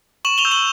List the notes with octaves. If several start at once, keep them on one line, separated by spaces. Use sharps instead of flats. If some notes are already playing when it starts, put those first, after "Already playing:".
C#6 E7 F#7
F7 G7
E6 G6
E7 F#7